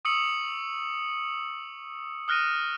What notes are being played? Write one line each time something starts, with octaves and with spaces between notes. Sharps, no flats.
C#6 D#6 E6 C#7 F#7
D#6 F6 F#6 A#6 D7 D#7